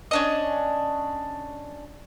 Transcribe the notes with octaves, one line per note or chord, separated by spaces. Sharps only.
C#4 D4 D#5